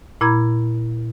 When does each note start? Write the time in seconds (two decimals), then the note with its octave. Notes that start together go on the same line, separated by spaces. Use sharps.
0.21 A#2 E4 A#5 B5 G#6